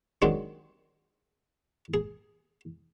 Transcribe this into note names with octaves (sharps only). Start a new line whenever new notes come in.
D#3 F#3 G#3 C4 D4
G#4